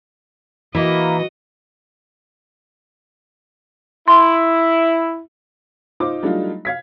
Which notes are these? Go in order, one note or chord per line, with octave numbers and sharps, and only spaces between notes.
E3 A#3 E4 F#4 D#5
E4 C6
D#4 F4 C5 D6
F#3 G3 A3 D4 D#4 F4
F5 G#6 B6